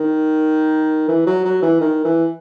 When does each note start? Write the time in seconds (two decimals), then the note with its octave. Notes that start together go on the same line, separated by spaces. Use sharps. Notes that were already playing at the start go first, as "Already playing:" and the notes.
Already playing: D#3
1.08 E3
1.26 F#3
1.45 F#3
1.62 E3
1.81 D#3
2.04 E3